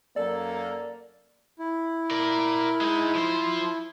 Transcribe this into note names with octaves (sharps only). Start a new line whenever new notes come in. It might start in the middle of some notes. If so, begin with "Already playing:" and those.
F#2 A#3 A4 D5
E4
A#4 D5
G#3 D#4
F3 C5